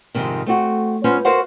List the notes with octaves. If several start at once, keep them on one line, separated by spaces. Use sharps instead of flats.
F2 G#2 C3 D#3
A3 C4 F#4
G#3 B3 C#4 F4 C5
F#4 A#4 C5 F5 F#5